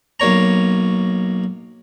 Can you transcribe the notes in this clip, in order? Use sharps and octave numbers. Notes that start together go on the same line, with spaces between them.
B1 A#3 C#5 A#5